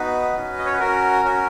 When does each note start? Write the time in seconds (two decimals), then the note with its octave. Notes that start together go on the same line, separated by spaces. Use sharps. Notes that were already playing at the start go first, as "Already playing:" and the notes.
Already playing: B3 D#4 F#4 B4
0.36 C#4 F#4
0.58 D#5
0.65 C#5
0.73 B4
0.79 C#4 F#4 A#4
1.25 C#4 F#4